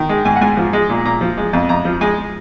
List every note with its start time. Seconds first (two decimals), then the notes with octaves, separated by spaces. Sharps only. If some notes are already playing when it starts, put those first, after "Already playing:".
Already playing: D#3
0.09 G#3
0.25 G#2 G#5
0.36 F#5
0.41 G#2 G#5
0.57 F3
0.73 G#3
0.90 A#2
1.05 A#2 A#5
1.21 F3
1.37 G#3
1.53 F2
1.69 F2 A#5
1.85 F3
2.01 G#3 G#5